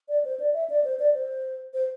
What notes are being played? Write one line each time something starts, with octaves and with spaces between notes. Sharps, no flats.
D5
C5
D5
E5
D5
C5
D5
C5
C5